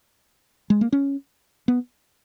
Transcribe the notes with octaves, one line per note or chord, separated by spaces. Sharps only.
G#3
A#3
C#4
B3